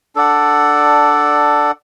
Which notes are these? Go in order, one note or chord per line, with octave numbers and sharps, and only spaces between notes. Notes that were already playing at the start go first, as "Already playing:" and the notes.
D4 A4 D5 F#5